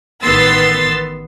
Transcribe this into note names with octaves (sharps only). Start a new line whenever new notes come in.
A1 D#3 B3 C6 E6 A6